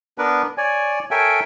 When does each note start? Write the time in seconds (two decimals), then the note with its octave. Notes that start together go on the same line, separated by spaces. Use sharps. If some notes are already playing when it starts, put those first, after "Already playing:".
0.18 B3 D4 A#4 B4
0.58 C#5 D5 G#5
1.11 A4 A#4 C#5 E5 G5 G#5